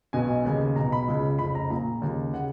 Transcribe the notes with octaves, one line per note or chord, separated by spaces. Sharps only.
B1 B2 G#5
D#2 C#3
B1 B2 A#5
B5
C#2 C#3
F1 F2 C#3 B5
A#5
A#1 A#2 A#5
D#2 C#3
C#3 F#5